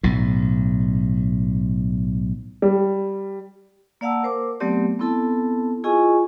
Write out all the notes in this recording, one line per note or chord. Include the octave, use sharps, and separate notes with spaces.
B1 A2
G3
A#3 D5 F5 F#5 A5 E6
A#4 C5 D6
F#3 A3 B3 C4 G4 D5
B3 C4 E4 A4 A5
E4 F4 G#4 D#5 G#5 C#6